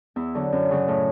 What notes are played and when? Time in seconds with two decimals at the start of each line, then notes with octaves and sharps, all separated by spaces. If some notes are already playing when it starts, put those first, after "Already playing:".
0.16 E2 E4
0.35 D3 F#3
0.52 F#2
0.71 C#3 F#3
0.88 A2